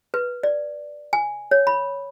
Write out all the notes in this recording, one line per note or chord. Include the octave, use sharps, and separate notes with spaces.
B4
D5
G#5
C#5
B5